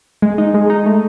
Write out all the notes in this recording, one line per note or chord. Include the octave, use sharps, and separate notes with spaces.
G#3
D#4
G#3
D#4
A3